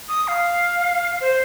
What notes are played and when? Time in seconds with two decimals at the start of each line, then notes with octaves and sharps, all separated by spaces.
0.09 D#6
0.28 F5
1.21 C5